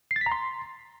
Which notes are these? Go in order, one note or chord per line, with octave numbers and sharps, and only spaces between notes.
C7
A6
B6
A#5
C6